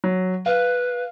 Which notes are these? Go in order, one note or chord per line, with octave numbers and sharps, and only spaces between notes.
F#3
B4 F5